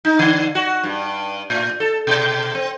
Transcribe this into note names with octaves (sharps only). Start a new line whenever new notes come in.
D#4
D3
F#4
G2
A2
A4
B2
C4